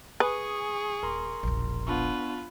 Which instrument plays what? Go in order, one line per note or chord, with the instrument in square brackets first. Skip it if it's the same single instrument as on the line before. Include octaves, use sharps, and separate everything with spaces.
[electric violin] G#4 C#6 [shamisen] B4 [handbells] G#5 D#6
[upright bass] D#1 [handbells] A#4 A#5 C6
[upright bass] E1 A#1
[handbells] B3 D4 C#6 [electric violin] F4 B4